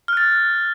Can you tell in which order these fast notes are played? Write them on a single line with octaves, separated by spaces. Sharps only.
F6 F#6 A6